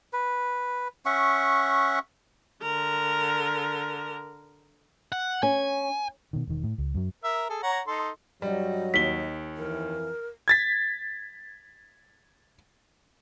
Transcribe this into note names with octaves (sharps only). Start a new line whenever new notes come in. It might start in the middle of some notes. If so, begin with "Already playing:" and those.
B4
C#4 E5 F#5 C#6
D3 A#4
F#5
C#4 G#5
B2 D#3
E1 D#3
A2
C#2
F#2 F#3
A#4 E5
G#4 A4
C#5 F#5 A#5
D#4 A4 C6
G2 F#3 G3 D#5
D#2 B6 G7
F2 E3 A#4
G#6 A6 B6